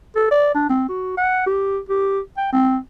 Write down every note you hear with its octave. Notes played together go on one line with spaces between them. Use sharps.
A4
D5
D4
C4
F#4
F#5
G4
G4
G5
C4